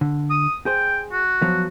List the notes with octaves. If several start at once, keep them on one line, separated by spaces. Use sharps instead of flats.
D3
D#6
G#4 C5 G5
F#4
F3 F#3 B3